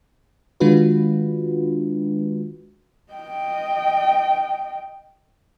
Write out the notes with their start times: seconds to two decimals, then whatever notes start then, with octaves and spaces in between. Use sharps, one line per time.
0.60 D#3 G#3 D4 F4 F#4 B4
3.13 D#5 G5